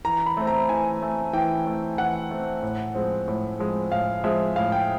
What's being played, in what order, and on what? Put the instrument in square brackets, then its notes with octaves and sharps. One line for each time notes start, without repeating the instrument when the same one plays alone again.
[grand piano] E3 A#5
B5
A3 C4
A#5
E3 G#5
A3 C4
E3 G5
A3 C4
E3 F#5
A3 C4
A2
F3 G#3 C4
A2
F3 G#3 C4
A2 F5
F3 G#3 C4 E5
A2 F5
G5